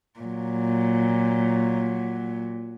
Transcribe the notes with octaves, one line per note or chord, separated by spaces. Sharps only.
A#2 F#3